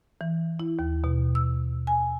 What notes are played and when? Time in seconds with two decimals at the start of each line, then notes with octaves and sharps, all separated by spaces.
0.21 E3
0.60 E4
0.79 D#2
1.04 B2
1.35 E6
1.87 G#5